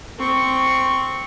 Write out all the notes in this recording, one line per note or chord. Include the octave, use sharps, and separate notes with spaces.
C4 C#6